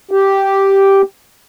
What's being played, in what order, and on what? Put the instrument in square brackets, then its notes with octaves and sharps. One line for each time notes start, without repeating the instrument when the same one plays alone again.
[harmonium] G4